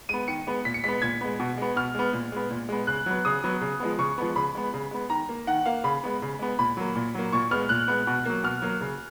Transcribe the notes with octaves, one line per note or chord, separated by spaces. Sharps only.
G#3 B3 D#7
D#3 C#7
G#3 B3
A#2 B6
C#7
G#3 B3 B6
A#2 G#6
G#3 B3
B2
G#3 B3
B2 F6
G#3 B3
A#2
G#3 B3
A#2
G#3 B3
C#3 F#6
F#3 B3
C#3 D#6
F#3 B3
C#3
F3 G#3 B3
C#3 C#6
F3 G#3 B3
C#3 B5
G#3 B3
C#3
G#3 B3
D#3 A#5
A#3
D#3 F#5
A#3 F5
C#3 B5
G#3 B3
C#3
G#3 B3
A#2 B5
F#3 A#3
A#2
F#3 A#3
A#2 C#6
G#3 B3 F6
A#2 F#6
G#3 B3
B2
F#3 A#3
B2 F6
F#3 A#3
C#3